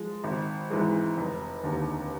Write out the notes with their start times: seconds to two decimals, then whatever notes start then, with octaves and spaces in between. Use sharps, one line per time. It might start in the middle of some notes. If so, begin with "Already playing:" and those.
Already playing: F3 G#3
0.24 G#1
0.70 G#2 E3 G#3
1.17 F1
1.64 D#2 D3